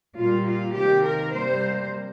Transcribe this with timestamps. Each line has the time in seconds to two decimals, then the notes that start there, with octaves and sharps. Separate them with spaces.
0.16 A#2 G3 A#3 F4
0.46 F4
0.75 C3 D#3 A#3 G4
1.04 A#4
1.34 C3 G3 A#3 C5